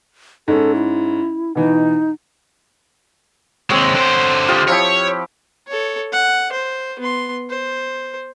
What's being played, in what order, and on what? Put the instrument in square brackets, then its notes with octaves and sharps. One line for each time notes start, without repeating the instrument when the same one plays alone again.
[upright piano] G#2 C#4 [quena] A4
[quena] E4
[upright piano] B2 E3 [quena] D#4
[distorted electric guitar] D#2 G#3 [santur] C4 C#5
[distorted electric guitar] D3 C5
[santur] F4 G4 D#5
[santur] F3 E4 G4 [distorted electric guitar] C#5
[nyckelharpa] A4 C#5
F#5
C5
B3 C6
C5